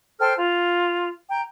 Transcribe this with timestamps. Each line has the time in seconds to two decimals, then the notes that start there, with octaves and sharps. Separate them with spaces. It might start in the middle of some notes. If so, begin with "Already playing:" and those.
0.20 A4 C5 G5 F6
0.38 F4
1.30 G5 A#5